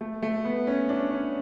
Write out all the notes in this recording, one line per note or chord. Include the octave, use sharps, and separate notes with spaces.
A3
A3
B3
C#4
D4
C#4